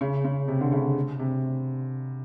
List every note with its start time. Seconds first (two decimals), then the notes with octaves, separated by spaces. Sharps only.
0.01 C#3
0.25 C#3
0.48 C3
0.61 D3
0.72 C#3
1.19 C3